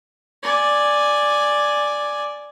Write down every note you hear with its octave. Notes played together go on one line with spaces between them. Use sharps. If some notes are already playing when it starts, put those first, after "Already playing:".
D5 G#5